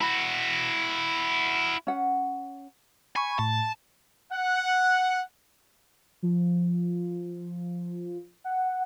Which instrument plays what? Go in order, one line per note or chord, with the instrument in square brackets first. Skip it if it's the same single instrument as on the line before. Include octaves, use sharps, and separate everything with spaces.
[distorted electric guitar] E4 F#4 [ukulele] B5
[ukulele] C#4 F#5
[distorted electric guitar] G#5 [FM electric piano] B5 C#6
[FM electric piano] A2 [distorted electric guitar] A5
[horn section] F#5
[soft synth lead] F3
F#5